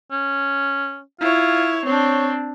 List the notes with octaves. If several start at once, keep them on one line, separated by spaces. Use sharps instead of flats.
C#4
E4 F4 C#5
C4 D4 C#5